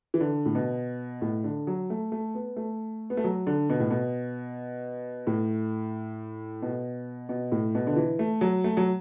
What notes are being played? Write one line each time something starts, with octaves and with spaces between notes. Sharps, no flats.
E3
D3
A2
B2
A2
D3
F#3
A3
A3
B3
A3
B3
A3
F#3
D3
B2
A2
B2
A2
B2
B2
A2
B2
D3
E3
A3
F#3
A3
F#3